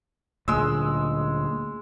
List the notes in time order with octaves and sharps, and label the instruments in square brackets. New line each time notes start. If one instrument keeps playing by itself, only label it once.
[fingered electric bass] D2 A#2 [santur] G#3 E6